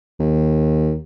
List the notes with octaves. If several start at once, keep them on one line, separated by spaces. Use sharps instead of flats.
D#2